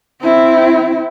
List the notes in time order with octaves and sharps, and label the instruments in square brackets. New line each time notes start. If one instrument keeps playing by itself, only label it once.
[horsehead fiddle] C4 E4